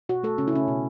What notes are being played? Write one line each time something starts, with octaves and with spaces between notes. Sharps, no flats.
B2 F#4
A3 A4
C#3 C#4
E4
C#3 C#4
B2